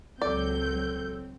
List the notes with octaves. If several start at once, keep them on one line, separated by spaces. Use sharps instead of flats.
C#2 F#3 C4 A4 D5 G6